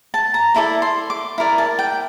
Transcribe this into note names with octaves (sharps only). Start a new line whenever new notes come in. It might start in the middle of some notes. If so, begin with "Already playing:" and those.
A5
A#5
E4 A4 D5 A5
C6
D6
E4 A#4 D5
A5
G5